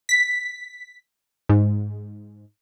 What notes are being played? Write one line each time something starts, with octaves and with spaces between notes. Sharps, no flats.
B6
G#2